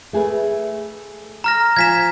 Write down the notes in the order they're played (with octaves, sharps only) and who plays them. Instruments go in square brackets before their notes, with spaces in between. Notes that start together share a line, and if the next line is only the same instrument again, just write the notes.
[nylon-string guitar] A3 G#4 B4
[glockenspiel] A#5 F6 A#6
[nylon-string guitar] F3 G#5 [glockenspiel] G#6 B6 E7